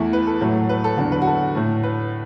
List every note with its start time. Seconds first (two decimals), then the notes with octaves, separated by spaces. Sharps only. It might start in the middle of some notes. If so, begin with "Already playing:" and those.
Already playing: E2 E3 A3 E4
0.13 B4
0.27 A4
0.41 A2 F#3 A3
0.69 B4
0.84 A4
0.97 E2 D3 F#3
1.12 B4
1.22 F#4
1.27 A4
1.55 A2 A3
1.83 B4